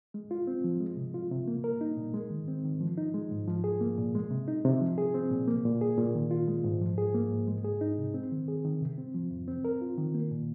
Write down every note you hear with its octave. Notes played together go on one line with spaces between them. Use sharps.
G#3
F4
C4
F3
G#3
C3
F4
C3
A#3
A#4
D#4
A#2
G#3
D#3
C4
D#3
F3
D#4
G#3
G#2
F3
G#4
A#3
A#2
G#3
C3
D#4
C3
F3
G#4
C4
A#2
A#3
A#2
G#4
A#2
D#3
F4
G#3
G#2
F3
G#4
A#3
G#2
G#3
G#4
D#4
C3
C4
D#3
G#4
D#3
C3
C4
F3
F2
C4
A#4
F4
D#3
A#3
A#2